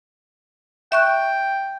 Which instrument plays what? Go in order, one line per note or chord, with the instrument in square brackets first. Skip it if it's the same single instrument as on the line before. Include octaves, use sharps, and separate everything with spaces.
[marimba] E5 C#6 F#6 [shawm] G5